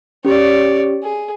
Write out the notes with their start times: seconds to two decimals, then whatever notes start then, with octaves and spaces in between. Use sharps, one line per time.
0.25 C#4 G4 C#5 D5
1.03 G#4